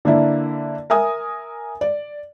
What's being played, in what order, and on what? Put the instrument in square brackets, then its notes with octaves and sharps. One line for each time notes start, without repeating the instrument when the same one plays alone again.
[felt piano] D3 A#3 D4 E4
A#4 E5 G#5 D#6
D5